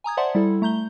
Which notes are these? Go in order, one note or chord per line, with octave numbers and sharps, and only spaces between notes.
G#5 A#5 D#6 G#6
C5 D5 E5 F#5 A5 C6
G3 E4 A4
A3 A#5 G6 G7